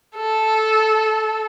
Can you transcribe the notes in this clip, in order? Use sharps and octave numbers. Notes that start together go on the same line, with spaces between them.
A4